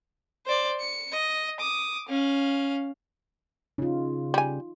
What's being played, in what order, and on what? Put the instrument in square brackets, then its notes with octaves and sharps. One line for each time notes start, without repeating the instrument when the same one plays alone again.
[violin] C5 D5
C#7
D#5
D6 D#6
C#4 F5
[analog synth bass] C#3 [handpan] D#4 F4
[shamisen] G3 G#5